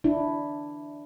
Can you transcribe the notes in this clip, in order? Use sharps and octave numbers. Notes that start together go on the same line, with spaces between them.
D4 E4